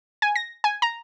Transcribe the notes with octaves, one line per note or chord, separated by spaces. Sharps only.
G#5
A#6
G#5
A#5